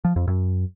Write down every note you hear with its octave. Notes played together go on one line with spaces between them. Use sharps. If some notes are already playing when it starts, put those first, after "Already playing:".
F3
F2
F#2